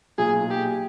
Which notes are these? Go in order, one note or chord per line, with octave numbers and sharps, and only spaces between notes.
B1 A#2 F#3 G#4
G4